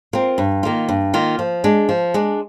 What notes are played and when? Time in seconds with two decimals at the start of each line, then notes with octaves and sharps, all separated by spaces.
0.13 C4 F4 A#4
0.38 G2
0.63 D#3 A#3 F4
0.89 G2
1.14 D#3 A#3 F4
1.39 F3
1.64 G#3 D4
1.89 F3
2.14 G#3 D4